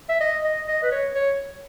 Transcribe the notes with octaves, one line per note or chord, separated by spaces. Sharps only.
E5
D#5
D#5
D#5
B4
C#5
C#5